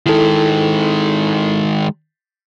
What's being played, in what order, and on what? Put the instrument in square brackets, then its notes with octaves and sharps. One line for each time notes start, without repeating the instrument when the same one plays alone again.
[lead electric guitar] D#3 G#3 [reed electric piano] E4 A4